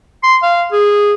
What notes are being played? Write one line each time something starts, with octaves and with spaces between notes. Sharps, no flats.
C6
F5
G#4